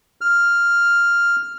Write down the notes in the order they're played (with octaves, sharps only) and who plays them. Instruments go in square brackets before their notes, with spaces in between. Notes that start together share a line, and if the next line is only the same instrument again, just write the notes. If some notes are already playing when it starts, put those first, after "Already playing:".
[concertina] F6